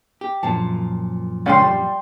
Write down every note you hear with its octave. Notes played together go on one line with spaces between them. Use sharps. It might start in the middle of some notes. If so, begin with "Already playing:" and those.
G4
F#2 A#2 F3 A5
C#2 C#4 D5 G5 C6
G3